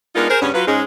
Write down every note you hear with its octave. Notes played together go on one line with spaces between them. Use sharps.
G#3 B3 D4 D#4 F4 A#4
G#4 A#4 C5
G2 C#3 B3 C#4
F#3 F4 B4
G#2 G#3 C#4